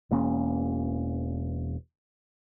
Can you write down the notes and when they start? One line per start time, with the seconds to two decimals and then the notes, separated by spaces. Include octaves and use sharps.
0.11 E1 E2 A#3 C#4